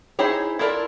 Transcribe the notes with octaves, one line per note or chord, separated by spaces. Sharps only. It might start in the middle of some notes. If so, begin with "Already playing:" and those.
D#4 E4 G#4 C5 C#5
E4 F4 A4 A#4 D5